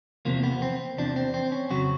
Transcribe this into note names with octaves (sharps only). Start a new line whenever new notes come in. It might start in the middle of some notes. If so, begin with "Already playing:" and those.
E2 C3 F3 A#3
B3
C4
E2 C3 F3 D4
C4
C4
C#4
F2 C#3 F#3 F#4